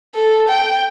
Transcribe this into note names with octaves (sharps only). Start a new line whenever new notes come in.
A4
G5